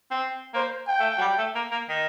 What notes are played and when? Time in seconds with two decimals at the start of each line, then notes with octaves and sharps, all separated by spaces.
0.11 C4
0.54 A#3 C5
0.88 G5
0.99 A3
1.18 F#3
1.21 G3
1.38 A3
1.55 A#3
1.71 A#3
1.89 D#3